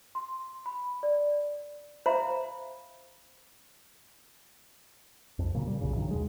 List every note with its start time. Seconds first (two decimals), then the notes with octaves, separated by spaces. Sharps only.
0.15 C6
0.66 B5
1.03 D5
2.06 C5 E5 F5 A#5 B5
5.39 C2 F2
5.54 A#2 C#3 F#3
5.67 G3
5.81 B1 F2 A#2 C#3
5.96 G2 D#3 F#3
6.11 D#2 B2 G#3